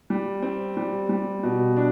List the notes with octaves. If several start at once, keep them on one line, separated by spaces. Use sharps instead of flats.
G3
C4
G3
G3
B2
D4